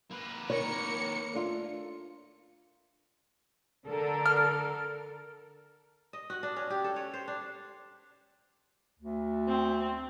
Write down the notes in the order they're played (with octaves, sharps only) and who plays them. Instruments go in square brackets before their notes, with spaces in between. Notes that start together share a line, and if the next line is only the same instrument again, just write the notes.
[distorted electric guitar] A#3 B4
[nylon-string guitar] D#3 [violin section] A#4 C#7 [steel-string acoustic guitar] C#5
[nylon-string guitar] A3 D4 F4
[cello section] D3 A4 A#4
[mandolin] F6
[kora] D#5
F#4
D4
C#4
G4
A4
C#5
C5
D4
[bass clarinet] D2
[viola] C4